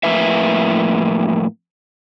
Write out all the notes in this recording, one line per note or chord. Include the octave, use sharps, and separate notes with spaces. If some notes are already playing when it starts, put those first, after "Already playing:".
F2 A2 E3 A#3 B4 E5